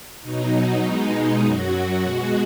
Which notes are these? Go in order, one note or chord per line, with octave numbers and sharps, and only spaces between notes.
B2 F#3 D#4
D#4
B2 G#3
F#2 F#3 F#4
B2 G#3